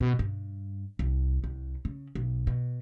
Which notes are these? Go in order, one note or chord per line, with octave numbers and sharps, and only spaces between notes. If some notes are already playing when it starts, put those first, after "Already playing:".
B2
G2
C2
C2
C#3
B1
B2